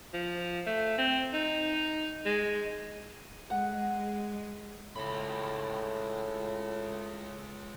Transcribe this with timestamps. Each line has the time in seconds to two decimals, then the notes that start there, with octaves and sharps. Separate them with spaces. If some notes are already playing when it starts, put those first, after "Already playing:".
0.14 F3
0.67 A3
0.98 C4
1.33 D#4
2.25 G#3
3.50 G#3 F#5
4.96 C#2 A2 B5